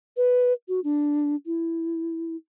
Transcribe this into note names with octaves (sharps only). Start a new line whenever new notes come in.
B4
F#4
D4
E4